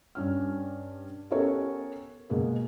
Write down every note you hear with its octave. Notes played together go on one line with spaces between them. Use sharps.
G2 C#4 F6
B3 C#4 G4 A4 A#4 C#5
B2 G#3 A#3 G#4